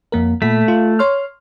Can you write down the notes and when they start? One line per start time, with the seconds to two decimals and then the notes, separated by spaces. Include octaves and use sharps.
0.12 F2 A#3 A#4
0.42 A#2 A3 B6
0.68 F4
0.99 C#5 C6 F6